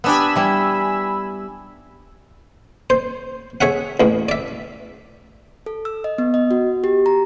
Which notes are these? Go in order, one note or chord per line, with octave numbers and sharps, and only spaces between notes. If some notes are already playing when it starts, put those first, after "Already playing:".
B3 D4 G4 G#5 B5 E6
G3 E4
C5
G#4 C#5 E5 F#5
A1 E2
D5 E5
A4
E6
D#5
B3
D#5
F#4
G4
A#5